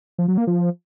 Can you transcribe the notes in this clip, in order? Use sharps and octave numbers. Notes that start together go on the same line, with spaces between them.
F3
F#3
A#3
F3